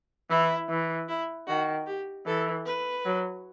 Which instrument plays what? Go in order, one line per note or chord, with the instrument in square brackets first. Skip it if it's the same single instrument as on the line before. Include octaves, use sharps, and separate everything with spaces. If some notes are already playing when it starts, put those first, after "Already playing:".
[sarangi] E3 [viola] E4
[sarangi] E3
[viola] E4
[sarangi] D#3 [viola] F#4
[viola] G4
[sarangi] E3 [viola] A4
[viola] B4
[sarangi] F#3